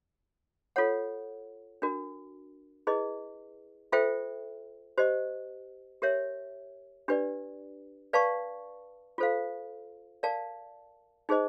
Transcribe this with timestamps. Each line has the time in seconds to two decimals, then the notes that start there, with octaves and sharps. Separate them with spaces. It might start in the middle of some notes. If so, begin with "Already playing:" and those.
0.76 F4 A4 C#5 F#5
1.82 D4 F#4 A#4
2.87 E4 G#4 B4 D#5
3.92 F4 A4 C5 E5 G5
4.98 G4 C5 D#5
6.02 G4 A#4 C#5 E5
7.08 D4 G4 B4 D5
8.13 B4 D5 F5 A5 C#6
9.18 F4 A4 C5 F5
10.23 A#4 D5 F5 A5
11.29 D#4 G#4 C5 D#5